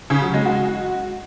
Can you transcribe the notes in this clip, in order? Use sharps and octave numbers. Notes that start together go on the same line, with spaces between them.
C#3
F#3
G#3
F#4